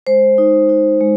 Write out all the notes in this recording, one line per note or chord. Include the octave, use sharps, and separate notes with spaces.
G#3 C5
D#4
D#4
G#3